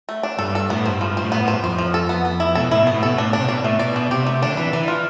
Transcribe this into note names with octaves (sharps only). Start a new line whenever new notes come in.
A3
D4
G2 A4
A4
A2 B3
G2 C5
G2 F3
G2
A2 C5
B3
A2 C5
G2
F2 C5
F3
A4
B3
B3
E4
B2 A4
A2 E4
B2 B3
A2
B2 A4
A2 D4
D4
C3
B2 D5
A2 A3
B2 D5
D4
C3 G4
A3
D3 D4
E3 B4
E3 D5
F4